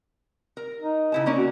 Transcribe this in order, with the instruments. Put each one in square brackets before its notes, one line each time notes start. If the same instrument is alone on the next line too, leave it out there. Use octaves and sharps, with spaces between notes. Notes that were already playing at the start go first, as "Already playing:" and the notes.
[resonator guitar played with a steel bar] A#4
[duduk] D#4
[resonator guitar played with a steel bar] C#3 E4 A5
A#3 C#4 D5
[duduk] F#4